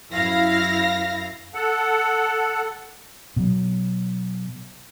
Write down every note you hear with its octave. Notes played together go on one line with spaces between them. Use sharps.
F#2 E4 F5 A#6
A4 F#5
B2 F#3